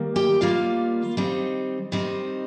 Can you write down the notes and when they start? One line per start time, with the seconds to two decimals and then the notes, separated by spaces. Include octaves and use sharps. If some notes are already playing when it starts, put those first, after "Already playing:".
Already playing: D#3 G3 A#3
0.16 G4 G5
0.41 D#3 G3 A#3 F4 F5
1.17 D#3 G3 C4 D#4
1.92 D#3 G3 C4 D#4